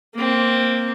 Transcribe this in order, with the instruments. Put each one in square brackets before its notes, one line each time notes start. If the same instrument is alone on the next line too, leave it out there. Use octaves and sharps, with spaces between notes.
[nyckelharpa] A#3 C4